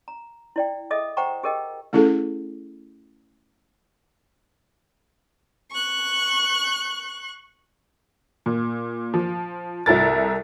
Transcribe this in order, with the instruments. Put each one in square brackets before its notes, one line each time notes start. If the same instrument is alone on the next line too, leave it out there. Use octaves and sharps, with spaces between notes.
[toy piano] A#5
E4 D5 G5
G#4 A4 D#5 E5 D#6
C5 F#5 G5 A#5 C#6
G4 G#4 A#4 D#5 G5
[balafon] A3 C#4 E4 G#4 A4
[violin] C#6 F#6
[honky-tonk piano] A#2
F3
C2 E4 A4 A#4 A6